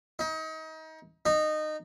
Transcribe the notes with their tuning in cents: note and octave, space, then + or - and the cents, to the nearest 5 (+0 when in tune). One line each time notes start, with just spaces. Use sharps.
D#4 +30
D#4 -20